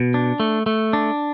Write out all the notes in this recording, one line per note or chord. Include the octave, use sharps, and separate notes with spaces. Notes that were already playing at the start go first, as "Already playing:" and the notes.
Already playing: B2
D4
A3
A3
D4